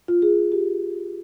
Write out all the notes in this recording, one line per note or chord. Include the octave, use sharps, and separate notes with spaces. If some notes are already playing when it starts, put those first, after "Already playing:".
F4
G#4
G4